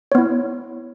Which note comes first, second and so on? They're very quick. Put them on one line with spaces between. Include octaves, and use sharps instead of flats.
C#5 B3 E4